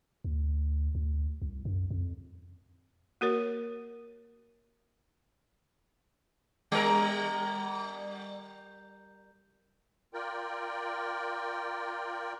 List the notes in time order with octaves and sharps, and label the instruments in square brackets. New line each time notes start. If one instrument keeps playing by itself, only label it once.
[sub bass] D2
D2
C2
F#2
F2
[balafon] A#3 F#4 A#4 C#5
[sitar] G3 A#4
[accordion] F4 A#4 D5 G5